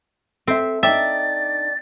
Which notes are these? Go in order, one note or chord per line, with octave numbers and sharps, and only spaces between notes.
C4 A4 E5
D4 D#4 D5 E5 G5 A6